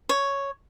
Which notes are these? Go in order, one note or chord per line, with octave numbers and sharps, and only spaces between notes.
C#5